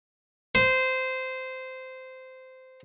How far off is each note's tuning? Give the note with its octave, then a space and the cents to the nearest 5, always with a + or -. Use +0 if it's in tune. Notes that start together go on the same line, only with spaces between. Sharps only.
C5 -15